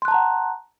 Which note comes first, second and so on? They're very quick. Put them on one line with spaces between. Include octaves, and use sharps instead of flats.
C6 F#6 A5 A#5 F#5